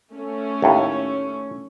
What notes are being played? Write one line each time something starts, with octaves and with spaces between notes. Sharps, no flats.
A3 C#4
D#2 A2